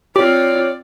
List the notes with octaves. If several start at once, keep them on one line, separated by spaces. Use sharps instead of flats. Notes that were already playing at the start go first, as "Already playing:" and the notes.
C4 F4 G4 C#5 D5